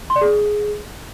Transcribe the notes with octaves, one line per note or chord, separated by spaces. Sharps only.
C6
D5
G#4